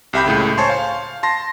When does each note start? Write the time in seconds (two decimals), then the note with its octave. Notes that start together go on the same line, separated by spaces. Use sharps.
0.13 C2 G4 E5 G5 B5 G6
0.26 C#2 A2 C#3
0.57 C5 C#5 G#5 A5 C6 C#6
0.70 F5
1.23 A5 C6 A#6